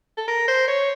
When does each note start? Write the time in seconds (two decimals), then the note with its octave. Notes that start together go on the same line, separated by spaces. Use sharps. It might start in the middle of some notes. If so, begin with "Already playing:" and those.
0.17 A4
0.28 A#4
0.48 C5
0.68 C#5